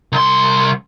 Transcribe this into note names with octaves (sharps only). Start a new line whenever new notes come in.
C2 C6